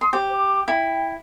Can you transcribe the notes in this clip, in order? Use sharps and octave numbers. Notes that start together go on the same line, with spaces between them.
C6 D#6
G4 C5
D6
E4 G5